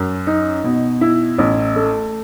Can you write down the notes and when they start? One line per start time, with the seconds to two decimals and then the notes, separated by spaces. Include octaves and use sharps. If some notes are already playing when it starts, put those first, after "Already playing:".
Already playing: F#2
0.27 D#4
0.64 B2
1.01 E4
1.38 A1
1.76 A3